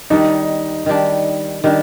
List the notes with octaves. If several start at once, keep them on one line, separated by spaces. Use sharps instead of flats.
D#3 G3 D4 D#4
D#3 G3 D4
D#3 G3 D4